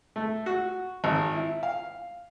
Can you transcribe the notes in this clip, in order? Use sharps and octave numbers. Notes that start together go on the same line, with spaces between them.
A3
F#4
G#1
E4
F5